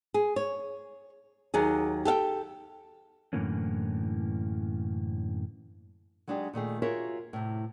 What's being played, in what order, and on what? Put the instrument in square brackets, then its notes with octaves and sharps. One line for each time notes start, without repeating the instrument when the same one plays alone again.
[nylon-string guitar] G#4
C#5
D#2 F#3 G#4
G4 A4 F5 G5
[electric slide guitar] F#2 A2 D3 E3 A#3 C#4
[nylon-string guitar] F#3 G#3 D4 D#4 G4 G#4
A#2 D#3 A3 G#4
F4 F#4 G#4 A#4 C#5 E5
A2 C3